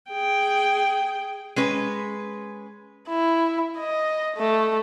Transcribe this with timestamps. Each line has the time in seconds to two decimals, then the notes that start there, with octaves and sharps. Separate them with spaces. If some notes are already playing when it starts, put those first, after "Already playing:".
0.11 G#4 G5
1.56 G#3 C#4 B4
3.09 E4
3.78 D#5
4.36 A3